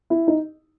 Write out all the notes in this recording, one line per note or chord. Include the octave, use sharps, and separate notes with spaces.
E4
D#4